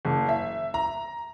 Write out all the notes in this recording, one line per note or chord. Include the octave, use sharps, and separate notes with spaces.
F#1
E5
A#5